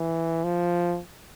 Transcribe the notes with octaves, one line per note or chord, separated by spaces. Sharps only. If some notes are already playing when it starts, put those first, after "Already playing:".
Already playing: E3
F3